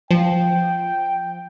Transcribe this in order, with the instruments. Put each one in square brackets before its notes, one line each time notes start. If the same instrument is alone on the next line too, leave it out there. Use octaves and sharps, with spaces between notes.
[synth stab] F3 [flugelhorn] G5